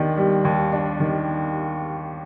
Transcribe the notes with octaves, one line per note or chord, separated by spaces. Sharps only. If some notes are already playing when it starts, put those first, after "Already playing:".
Already playing: D#2 D#3 D4
G3
D#2
D4
D#3